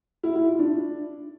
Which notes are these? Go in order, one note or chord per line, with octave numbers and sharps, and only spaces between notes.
E4
E4
F4
D4